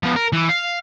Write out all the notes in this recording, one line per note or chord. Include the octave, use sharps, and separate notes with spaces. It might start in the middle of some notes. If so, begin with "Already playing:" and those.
F3 B3
A#4
E3
F5